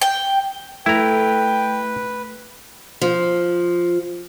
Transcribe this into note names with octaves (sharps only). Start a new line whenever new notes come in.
G5
A3 E4 B4 G5 A#5
F3